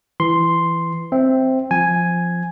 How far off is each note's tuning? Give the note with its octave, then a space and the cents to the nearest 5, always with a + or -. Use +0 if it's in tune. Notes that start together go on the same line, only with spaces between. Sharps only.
E3 +15 C6 +0
C4 +0 E5 +0
F3 +0 G#5 +0